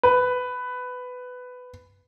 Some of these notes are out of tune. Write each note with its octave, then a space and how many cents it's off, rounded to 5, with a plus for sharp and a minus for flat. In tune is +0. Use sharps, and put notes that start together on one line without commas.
B4 +15